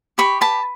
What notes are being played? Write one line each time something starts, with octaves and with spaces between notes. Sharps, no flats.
G4 B5 C#6
B4 A5 B5